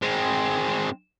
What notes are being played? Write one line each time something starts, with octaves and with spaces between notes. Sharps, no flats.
G#3 C4